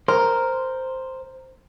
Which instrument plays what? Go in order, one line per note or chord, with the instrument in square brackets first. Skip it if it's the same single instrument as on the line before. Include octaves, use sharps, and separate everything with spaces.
[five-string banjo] A#4 [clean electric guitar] C5